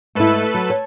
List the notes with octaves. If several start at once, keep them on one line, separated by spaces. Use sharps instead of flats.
G#2 A3 E4 A4 B4
F#3
C#5 A5